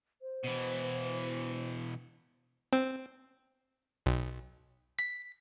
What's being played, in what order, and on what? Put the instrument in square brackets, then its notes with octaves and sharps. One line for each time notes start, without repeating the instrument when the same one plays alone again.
[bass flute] C5
[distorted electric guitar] B2 E3
[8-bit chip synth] C4
B1
B6